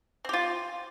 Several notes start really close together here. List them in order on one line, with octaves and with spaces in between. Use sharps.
C4 G4 F4